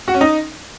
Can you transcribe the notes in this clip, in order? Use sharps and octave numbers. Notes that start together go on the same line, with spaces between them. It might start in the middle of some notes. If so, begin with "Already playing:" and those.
F#4
C#4
D#4